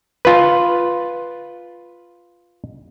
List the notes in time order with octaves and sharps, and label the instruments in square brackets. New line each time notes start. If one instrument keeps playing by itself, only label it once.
[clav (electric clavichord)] F4 B4